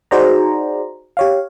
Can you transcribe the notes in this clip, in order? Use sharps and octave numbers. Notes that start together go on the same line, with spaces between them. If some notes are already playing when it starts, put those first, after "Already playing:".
D#4 F#4 G#4 C5 D5 A#5
G4 C#5 F5